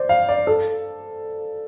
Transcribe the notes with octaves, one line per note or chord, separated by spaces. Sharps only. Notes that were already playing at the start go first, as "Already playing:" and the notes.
Already playing: C5 D5
F5
D5
A4